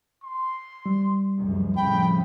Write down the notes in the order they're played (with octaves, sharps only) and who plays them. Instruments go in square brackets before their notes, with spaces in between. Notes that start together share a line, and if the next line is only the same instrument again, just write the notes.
[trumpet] C6
[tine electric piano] G3
[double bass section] F1 C#2 F#2
[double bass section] F2 A2 C#3 [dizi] G5 [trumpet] B5